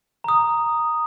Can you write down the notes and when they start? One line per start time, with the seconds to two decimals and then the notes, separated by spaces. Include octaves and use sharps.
0.24 A#5 D#6